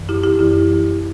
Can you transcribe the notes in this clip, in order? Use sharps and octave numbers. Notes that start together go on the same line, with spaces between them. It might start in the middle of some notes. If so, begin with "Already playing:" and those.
Already playing: F#2 E3
E4 G4
E4 G4
F#2 E3 E4 G4